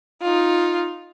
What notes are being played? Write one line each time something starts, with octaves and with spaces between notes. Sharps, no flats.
D#4 F4